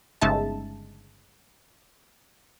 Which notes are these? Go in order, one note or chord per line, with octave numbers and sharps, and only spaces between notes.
G1 C#3 G#3 D#4 E5 A5